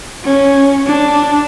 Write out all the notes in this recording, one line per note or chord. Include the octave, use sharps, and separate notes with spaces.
C#4
D4